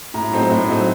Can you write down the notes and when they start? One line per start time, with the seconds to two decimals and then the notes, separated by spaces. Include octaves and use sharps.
0.14 A2 A#5
0.32 F#3 A3 C4 D#4
0.51 A2
0.68 F#3 A3 C4 D#4